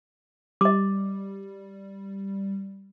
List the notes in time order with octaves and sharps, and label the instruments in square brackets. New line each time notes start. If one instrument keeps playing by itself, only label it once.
[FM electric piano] G3 [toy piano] D#5 D6